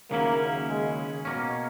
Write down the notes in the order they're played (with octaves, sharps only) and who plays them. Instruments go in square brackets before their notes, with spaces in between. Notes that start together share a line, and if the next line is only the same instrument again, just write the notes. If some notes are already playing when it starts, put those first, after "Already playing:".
[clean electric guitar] D#2 C#3 F#3 C#4 E4 [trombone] A#3
[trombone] G#3
[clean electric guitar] B2 A#3 C#4